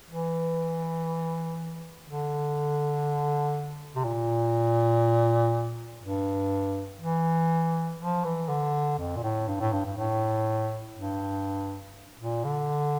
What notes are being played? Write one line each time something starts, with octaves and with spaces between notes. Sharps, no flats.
E3
D3
C3
A#2
G2
E3
F3
E3
D3
F2
A#2
A2
G2
A2
G2
G2
A2
G2
A#2
D3